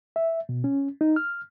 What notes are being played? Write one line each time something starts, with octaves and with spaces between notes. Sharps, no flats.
E5
B2
C#4
D#4
F6